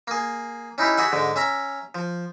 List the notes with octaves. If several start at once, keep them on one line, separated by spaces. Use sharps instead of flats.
A#3 G#4
C#4 D#4 E4 G4
F#4 G#4 E5 F#5
G#2 D3 G#3
C#4 E5 A#5
F3